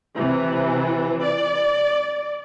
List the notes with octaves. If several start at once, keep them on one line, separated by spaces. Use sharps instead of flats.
C3 E3
D5